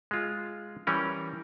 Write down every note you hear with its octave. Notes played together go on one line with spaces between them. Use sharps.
G#3 F4
E3 G3 C#4 A#4